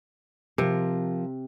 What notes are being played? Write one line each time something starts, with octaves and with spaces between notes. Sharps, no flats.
C3 F3 A#4